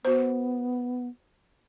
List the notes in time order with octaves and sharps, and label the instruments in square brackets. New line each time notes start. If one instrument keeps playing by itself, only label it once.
[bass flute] B3 [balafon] F#4 C5